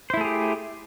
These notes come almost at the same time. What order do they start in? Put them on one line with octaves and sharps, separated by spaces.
C5 E4 A3 G#4 G4